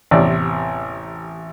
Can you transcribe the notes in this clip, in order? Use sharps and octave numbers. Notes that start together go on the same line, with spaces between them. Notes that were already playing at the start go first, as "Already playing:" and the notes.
A1 E2 C3 C4 D5